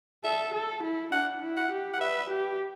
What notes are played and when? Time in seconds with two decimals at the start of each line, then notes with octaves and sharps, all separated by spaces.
0.24 A4 E5
0.54 A4
0.83 E4
1.12 D4 F#5
1.42 E4
1.57 F#5
1.71 G4
1.94 F#5
2.01 B4 E5
2.30 G4